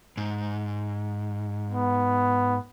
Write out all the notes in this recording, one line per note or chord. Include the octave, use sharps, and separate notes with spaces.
G#2
B3